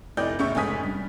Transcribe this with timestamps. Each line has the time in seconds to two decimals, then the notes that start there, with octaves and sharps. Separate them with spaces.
0.17 F1 E4 D5 D#5 G6
0.39 A1 C#3 E5 C#6
0.55 F1 G#2 C#4 G#5 D#6 B6
0.83 G2